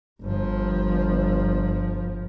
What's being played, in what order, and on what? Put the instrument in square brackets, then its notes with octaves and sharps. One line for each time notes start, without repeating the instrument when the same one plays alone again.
[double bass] G1 F3